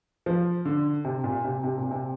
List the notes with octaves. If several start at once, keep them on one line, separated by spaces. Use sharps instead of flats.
F3
D3
C3
A#2
C3
C3
A#2
C3